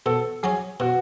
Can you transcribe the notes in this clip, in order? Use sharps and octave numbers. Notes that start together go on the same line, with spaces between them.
B2 A4
F#3 C#4 G#4
B2 F#4